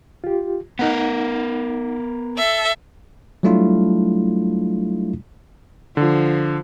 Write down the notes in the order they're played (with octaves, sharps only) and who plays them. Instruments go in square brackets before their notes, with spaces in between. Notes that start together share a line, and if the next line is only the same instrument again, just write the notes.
[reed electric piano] F4 G4
[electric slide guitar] B3 A#4 [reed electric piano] D#4 F#5
[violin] A4 E5
[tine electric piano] F#3 G3 A3 D4 E4 F4
[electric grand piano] D3 [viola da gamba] F3